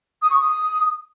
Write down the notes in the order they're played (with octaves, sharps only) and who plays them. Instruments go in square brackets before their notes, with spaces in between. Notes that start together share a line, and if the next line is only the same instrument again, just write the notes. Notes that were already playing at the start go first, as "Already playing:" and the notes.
[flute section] D#6
C#6
D#6